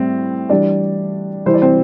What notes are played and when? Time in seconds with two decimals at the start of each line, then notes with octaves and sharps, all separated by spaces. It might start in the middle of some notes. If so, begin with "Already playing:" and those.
Already playing: A2 G3 C4
0.50 E3 G3 D4 D5
1.46 E3 G3 E4 C5
1.54 D5
1.62 C4 C5